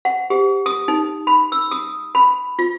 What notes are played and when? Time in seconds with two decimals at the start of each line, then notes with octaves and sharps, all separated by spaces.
0.05 F#5
0.30 G4
0.66 D#6
0.88 D#4
1.27 B5
1.52 E6
1.71 D#6
2.15 B5
2.59 F4